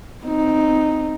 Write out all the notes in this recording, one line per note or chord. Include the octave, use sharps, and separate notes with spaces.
C4 D#4